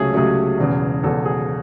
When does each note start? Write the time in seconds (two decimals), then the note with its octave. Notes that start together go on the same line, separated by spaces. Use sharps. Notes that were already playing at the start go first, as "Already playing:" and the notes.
Already playing: C#2 C3 F#3 A3 C#4 G#4
0.14 C#2 C3 F#3 A3 C#4 G#4
0.58 E1 E2 C#3
1.03 E1 E2 C#3 A4
1.25 G#4